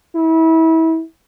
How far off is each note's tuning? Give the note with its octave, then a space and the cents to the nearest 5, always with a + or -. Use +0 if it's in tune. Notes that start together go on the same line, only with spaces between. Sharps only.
E4 -30